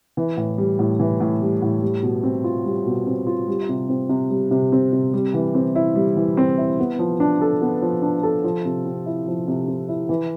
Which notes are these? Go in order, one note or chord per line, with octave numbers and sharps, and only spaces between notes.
E3
A2
G3
A2
E3
A2
G3
A2
G3
B2
C4
F4
G3
B2
C4
F4
G3
C3
C4
C3
G3
C3
C4
C3
G3
E3
C4
E4
G3
E3
C4
E4
B3
F3
D4
A4
B3
F3
D4
A4
F3
C3
C4
E4
F3
C3
C4
E4
E3